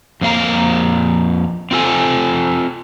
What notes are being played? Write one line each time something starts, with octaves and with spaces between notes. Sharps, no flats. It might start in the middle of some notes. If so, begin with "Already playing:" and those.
F2 A#3 F5 A#5
C4 F4 A4 G#5